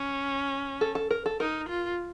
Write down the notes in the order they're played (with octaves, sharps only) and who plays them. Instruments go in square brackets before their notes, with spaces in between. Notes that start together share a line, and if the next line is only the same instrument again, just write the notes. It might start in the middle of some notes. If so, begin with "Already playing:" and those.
Already playing: [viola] C#4
[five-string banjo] A4
A4
A#4
A4
[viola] D#4 [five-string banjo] A#4
[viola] F4